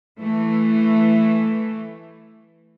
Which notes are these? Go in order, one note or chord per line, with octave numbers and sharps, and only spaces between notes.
E3 A3